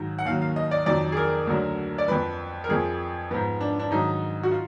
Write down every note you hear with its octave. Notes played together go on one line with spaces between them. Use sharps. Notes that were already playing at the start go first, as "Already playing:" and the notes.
Already playing: G#2 D#3 F#3
F#5
D#2 D#3 F#3 F5
F5
D#5
D5
F2 D#3 F#3 D5
G#4
A#4
D2 D3 F#3
D5
F2 F3 B4
A#4
F2 F3 G#4
G#2 F3 B3
D4
D4
G#2 D#3 F#3 D#4
F#4
F4